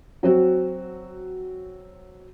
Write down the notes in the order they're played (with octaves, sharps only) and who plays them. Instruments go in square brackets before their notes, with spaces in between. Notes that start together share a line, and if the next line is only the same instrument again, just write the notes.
[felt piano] F#3 C4 F#4